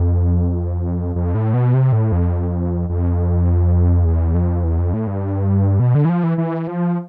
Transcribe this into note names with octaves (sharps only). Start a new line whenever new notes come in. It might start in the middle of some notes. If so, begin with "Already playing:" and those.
Already playing: F2
F2
A2
B2
C3
A2
F2
F2
E2
F2
E2
F2
A2
G2
B2
D3
E3
F3
E3
E3
F3